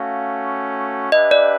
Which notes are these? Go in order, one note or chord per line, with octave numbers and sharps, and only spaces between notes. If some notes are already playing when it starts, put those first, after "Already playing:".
Already playing: A3 C#4 F#4 F5
D4 G4 B4 D#5 E5
D5